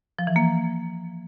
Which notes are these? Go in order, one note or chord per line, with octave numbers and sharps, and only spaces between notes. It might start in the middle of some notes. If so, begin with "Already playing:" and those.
F3
E3
A#3